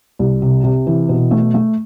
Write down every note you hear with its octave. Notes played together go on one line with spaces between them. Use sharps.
C2
C3
C3
E3
B2
A3
A3